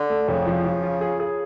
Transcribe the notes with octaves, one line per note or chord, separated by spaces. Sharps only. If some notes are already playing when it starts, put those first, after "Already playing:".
Already playing: D3
A3
F2 C#3
F3
F3
F4
G#4
G#4